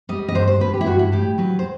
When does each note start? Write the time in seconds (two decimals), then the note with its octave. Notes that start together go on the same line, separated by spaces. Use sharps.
0.09 G3 D#5
0.28 D#5
0.35 G2 C5
0.47 C5
0.60 G2 B4
0.74 G4
0.81 E4
0.86 G2 F#4
0.99 E4
1.12 A2 G4
1.38 F#3 B4
1.59 C5